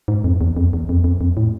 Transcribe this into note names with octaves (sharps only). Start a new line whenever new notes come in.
G#2
F2
E2
F2
E2
F2
F2
F2
A2